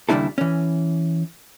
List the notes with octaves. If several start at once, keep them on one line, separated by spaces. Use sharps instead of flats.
D#2 C#3 G3 D4 E4 A4
E3 C#4